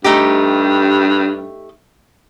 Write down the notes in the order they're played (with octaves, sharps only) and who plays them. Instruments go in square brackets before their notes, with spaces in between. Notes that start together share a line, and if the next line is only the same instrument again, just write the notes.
[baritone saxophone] G2 [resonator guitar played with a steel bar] A3 D#4 G4